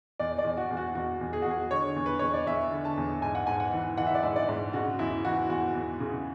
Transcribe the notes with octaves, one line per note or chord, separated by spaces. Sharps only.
E2 D5
D5
E2
F#4
E2
F#4
E2 F#4
E2
G#4
E2 F#4
G#4
D3 C#5
E2
B4
E2 C#5
D5
E2 E5
D3
A5
E2
G#2 G#5
F#5
G#2 G#5
F#5
E3
E3 F#5
E5
D5
G#2 E5
D5
G#2
C#3 F#4
E2 E4
E3 F#4
E2 F#4
E2
C#3